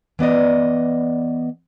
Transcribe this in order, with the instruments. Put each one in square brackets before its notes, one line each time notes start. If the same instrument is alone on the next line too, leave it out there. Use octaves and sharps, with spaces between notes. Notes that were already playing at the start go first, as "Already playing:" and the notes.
[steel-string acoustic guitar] E3 B3 D5 D#5